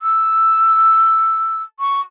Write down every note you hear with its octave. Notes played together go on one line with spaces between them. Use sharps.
E6
C#6